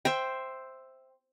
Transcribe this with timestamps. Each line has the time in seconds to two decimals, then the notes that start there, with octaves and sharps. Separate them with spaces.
0.05 C5 E5 G5